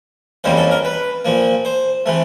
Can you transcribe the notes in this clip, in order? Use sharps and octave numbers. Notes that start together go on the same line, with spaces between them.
F2 C#3 E3 G3 A#3 C5
A4
A#4
B4
A#2 F3 A#3
C5
C3 E3 A3